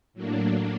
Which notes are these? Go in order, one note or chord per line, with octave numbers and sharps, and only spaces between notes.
A2 F#3 A#3 D4